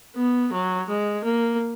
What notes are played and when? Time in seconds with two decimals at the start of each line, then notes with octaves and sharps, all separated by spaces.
0.16 B3
0.52 F#3
0.88 G#3
1.24 A#3